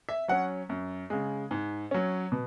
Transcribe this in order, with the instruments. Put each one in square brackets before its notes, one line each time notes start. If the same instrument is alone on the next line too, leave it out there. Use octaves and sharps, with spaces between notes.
[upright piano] E5
F#3 C#4 F#5
F#2
C#3 G#3
G#2
F#3 C#4
B2